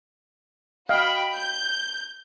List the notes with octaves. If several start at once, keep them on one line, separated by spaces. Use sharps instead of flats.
F#4 D#5 F5 G5 B5
G6